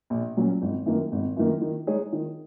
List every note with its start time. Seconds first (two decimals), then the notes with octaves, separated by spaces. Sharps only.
0.10 A#1
0.37 A#2 F#3 C#4
0.62 G#1
0.86 F#2 D#3 A#3
1.12 G#1
1.36 F#2 D#3 A#3
1.61 D#3
1.87 G#3 D#4 G#4 C#5
2.13 D#3